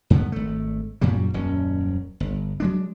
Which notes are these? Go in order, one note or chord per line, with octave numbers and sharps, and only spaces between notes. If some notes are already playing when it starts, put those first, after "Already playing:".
G2 D3 D#3 B3
G#1 A3
F#2 A#2 F#3 G3
D#1 F#2 C#4
G1
F#3 G#3 D4